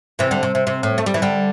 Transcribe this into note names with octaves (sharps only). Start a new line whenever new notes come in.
C3 E3
D3 G3
C3
C3
C3
A2
A3
G3
E3
D3 G3